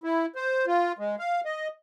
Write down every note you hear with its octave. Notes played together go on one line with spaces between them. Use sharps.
E4
C5
F4
G#3
F5
D#5